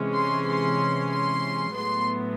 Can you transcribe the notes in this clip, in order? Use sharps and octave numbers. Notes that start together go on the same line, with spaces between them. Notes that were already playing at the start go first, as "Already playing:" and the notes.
Already playing: C3 E3 G#3 C#4
C6
C6
C6
A2 F#3 B3 C6